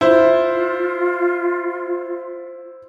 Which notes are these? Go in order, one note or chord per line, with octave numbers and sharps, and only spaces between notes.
E4 F4 C5